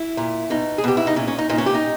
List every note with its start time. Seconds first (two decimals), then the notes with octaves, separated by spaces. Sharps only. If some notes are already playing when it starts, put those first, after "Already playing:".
Already playing: E4
0.17 A#2
0.50 B2 D#4
0.78 G#4
0.84 B2 G4
0.97 E4
1.07 D#4
1.16 A#2 C#4
1.28 C#4
1.38 D#4
1.49 A#2 D#4
1.58 C#4
1.66 G4
1.75 D#4